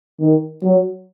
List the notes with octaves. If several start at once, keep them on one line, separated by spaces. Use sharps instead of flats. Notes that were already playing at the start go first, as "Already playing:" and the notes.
D#3
F#3